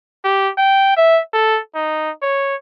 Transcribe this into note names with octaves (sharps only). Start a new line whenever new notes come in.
G4
G5
E5
A4
D#4
C#5